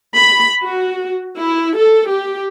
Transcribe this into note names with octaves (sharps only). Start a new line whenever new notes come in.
B5
F#4
E4
A4
G4